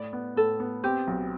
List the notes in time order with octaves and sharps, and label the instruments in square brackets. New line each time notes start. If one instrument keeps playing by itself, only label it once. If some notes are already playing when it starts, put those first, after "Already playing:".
Already playing: [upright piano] A2 [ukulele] D5
[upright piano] B3
[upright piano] A2 [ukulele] A4
[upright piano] B3
[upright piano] C4 [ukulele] G4
[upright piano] B1